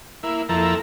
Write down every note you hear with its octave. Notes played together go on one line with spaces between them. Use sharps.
A#3 E4
F2 A#3 E4 A4 A#5